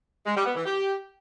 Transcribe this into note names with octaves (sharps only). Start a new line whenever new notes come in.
G#3
G3
B3
E3
G4